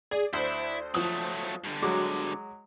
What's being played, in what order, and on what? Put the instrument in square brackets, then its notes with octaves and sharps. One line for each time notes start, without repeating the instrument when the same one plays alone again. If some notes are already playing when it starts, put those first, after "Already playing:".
[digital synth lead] G#4 [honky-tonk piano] D5
[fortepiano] D2 [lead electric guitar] E4 [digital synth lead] C5
[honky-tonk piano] F3 D#6 [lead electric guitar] F#3 A3
[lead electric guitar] G2 D3
[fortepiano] F#3 G#3 [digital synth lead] F#4 [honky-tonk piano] D6